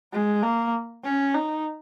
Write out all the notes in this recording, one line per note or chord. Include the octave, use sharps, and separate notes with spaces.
G#3
A#3
C#4
D#4